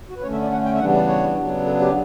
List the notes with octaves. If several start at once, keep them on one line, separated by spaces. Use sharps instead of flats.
F#4
B4
D3 A3 C#4 C#5
E5
D5
F#5
G5
E5
C#3 E3 G3 B3 D4 F#5
D5
C#5
C#3 F#3 B3 D4
A4
G4